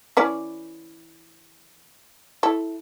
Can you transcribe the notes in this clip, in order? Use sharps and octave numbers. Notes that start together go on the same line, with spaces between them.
E3 C#4 D5
E4 A4